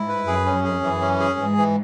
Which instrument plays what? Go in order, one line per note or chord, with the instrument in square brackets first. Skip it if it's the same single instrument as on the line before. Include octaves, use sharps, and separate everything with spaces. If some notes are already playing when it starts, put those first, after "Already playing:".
Already playing: [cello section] G#2 [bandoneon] E4
[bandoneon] B4
[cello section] F#2 [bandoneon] G#4
[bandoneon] C#4
G#4
[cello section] F#2 [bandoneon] E3
[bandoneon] C#4
G#4
[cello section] G#2 [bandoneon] E3
[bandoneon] E3